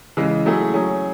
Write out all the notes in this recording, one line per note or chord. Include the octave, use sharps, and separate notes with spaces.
C#3 E3 G#3
F#3 A3 E4 G#4
F#3 C#4 G#4